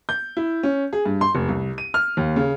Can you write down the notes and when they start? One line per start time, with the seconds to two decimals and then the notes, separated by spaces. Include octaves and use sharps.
0.09 G6
0.37 E4
0.63 C#4
0.93 G#4
1.05 G2
1.21 C6
1.35 F1
1.48 C2
1.78 D#7
1.94 F6
2.17 D#2
2.36 C#3